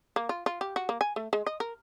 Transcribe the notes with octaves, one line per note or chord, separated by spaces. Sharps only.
A#3
F4
F4
G4
F#4
A#3
G#5
A3
G#3
D#5
A#4